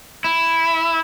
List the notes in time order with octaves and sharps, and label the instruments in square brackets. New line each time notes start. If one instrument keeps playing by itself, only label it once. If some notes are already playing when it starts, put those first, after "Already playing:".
[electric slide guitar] E4